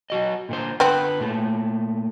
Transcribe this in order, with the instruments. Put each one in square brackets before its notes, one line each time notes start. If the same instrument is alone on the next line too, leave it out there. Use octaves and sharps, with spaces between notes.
[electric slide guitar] F#3 F#4 D#5
A#2 D3 C5
[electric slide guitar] D3 B4 [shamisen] B3 C4
[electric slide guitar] A#2 A3